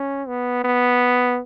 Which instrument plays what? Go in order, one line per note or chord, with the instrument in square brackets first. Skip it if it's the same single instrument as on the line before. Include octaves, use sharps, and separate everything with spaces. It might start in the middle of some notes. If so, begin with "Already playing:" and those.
Already playing: [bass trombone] C#4
B3
B3